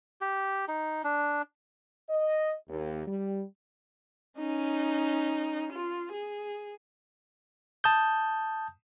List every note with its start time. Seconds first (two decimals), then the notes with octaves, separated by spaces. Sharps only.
0.21 G4
0.68 D#4
1.04 D4
2.09 D#5
2.69 D#2
3.07 G3
4.38 C#4 D#4
5.73 F4
6.13 G#4
7.84 A5 D#6 G6